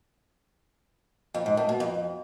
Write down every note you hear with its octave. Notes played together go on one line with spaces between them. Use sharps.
F2
G#2
A2
B2
F2